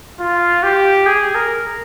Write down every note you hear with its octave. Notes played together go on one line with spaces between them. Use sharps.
F4
G4
G#4
A#4